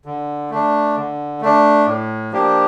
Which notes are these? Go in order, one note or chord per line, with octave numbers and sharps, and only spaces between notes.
D3
A3 D4
D3
A3 D4
A2
F3 A#3 D4 G4